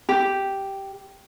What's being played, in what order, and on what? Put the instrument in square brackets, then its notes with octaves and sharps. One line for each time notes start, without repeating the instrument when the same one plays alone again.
[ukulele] G4